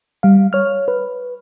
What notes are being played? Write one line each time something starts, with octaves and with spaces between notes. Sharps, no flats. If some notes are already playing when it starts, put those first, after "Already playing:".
G3 F5
C#5 F6
B4